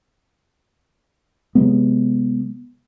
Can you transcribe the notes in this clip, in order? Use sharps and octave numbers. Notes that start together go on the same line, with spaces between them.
C3 F#3 G#3 B3